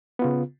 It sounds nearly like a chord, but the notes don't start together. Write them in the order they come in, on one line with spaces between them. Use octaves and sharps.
B3 F4 C#3